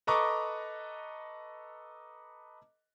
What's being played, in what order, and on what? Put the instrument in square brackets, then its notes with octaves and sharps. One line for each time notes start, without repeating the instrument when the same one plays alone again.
[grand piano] A4 B4 D#5 A#5 C#6 D6